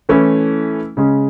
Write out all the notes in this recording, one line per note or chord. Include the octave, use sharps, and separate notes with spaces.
E3 A3 C#4 E4
C#3 G#3 C#4